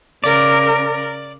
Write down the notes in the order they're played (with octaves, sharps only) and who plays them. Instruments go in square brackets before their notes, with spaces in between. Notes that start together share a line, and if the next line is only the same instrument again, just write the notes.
[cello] C#3 A#4 [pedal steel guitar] D5